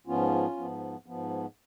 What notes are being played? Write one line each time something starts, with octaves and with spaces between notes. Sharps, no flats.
G#2 F3 B3 C#4 F4
G#2 F3 B3
G#2 F3 B3